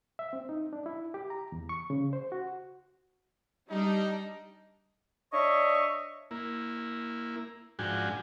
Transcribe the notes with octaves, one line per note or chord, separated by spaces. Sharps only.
E5
C4
D#4
D4
E4
G4
A#5
E2
C#6
C#3
C5
F#4
G3 D4 D#4
D4 C#5 D#5 E5 C#6
A#3 E4
G#2 F3 D4 F#4 G5 G#5